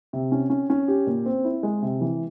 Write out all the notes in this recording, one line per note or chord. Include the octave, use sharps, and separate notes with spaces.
C3
C#4
C#4
C#4
G4
A#2
C4
E4
G#3
C3
E3